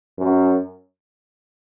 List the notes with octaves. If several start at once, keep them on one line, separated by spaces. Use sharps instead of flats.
F#2